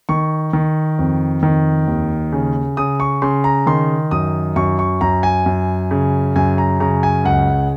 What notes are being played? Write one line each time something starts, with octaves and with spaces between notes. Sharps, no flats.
D#3 C#6
D#3
F2
D#3
D#2
C#3
C#3 D#6
C#6
C#3 C6
A#5
D#3 C6
F#2 D#6
F#2 C#6
C#6
F#2 A#5
G#5
F#2
C#3
F#2 G#5
A#5
C#3 A#5
G#5
C#2 F#5